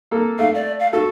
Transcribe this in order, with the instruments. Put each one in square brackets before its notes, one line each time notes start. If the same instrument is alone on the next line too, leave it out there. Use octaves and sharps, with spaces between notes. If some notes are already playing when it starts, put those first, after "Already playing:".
[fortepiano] A#3 A4
[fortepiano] A3 [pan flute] F5
[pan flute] D5
F5
[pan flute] F#4 [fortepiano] A4